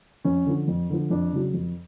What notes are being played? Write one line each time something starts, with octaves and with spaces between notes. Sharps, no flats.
F2 C#4
D3 F3
F2
D3 F3
F2 D4
C#3 F#3
F2